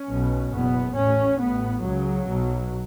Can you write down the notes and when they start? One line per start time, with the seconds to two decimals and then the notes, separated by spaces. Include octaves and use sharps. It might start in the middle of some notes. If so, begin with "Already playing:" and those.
Already playing: C#4
0.09 B1 B2
0.52 F#1 E2 B2 B3
0.96 A1 A2 C#4
1.40 A1 A2 B3
1.83 C#2 C#3 F#3
2.26 B1 B2